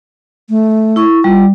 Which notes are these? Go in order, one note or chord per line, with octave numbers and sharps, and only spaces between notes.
A3
E4 C#6
G3 F4